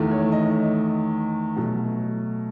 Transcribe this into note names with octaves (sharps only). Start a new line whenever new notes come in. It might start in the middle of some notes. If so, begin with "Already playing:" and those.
Already playing: E2 D#3 A3
C#5
D#5
B2 F#3 A3